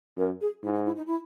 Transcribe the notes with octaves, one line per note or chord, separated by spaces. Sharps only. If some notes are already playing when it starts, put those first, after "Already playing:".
F#2 A#4
G#4
G#2 E4
D#4
E4
D#4
E4